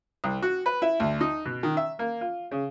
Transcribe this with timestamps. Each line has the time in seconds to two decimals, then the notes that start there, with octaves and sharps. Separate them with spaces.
0.24 C2
0.42 F#4
0.66 B4
0.82 E4
1.00 D2
1.21 D#4
1.45 B2
1.63 D#3
1.77 E5
1.99 A#3
2.21 F4
2.51 C#3